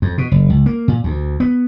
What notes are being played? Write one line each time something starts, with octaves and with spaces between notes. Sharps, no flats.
F2
B2
F#1
C#2
A#3
A#2
D2
B3